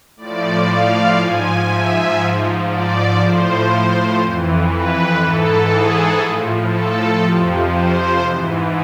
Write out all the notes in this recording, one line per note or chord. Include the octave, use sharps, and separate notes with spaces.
A2 F3 D5
F5
G#2 F3 G#5
E5
G#2 F3
D5
A2 F3 C5
F2 E3
B4
G#2 E3 A4
G#4
A2 F3
A4
F2 C3 F3
C5
G#2 E3